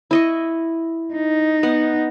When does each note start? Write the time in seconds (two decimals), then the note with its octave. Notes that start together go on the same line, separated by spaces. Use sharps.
0.11 E4 D#5 C#6
1.15 D#4
1.63 B3 F#5